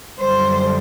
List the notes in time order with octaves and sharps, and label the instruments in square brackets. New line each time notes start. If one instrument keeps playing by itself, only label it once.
[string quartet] F#2 D3 G3 C5